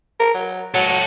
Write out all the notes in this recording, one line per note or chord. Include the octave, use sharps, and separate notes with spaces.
A#4
F#3
F#3 A4 C#5
F#3